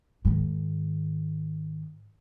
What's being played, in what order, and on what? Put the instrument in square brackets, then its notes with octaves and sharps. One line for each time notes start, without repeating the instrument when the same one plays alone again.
[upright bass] G#2 D#3